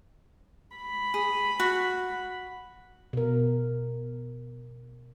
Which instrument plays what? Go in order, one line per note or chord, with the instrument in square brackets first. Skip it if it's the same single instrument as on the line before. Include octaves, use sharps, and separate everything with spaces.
[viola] B5
[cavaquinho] G#4
F#4
[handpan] B2 A#4